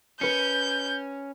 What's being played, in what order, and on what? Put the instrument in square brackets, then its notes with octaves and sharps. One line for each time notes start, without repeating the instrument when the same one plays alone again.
[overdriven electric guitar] C#4 [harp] B4 C#7 [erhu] G6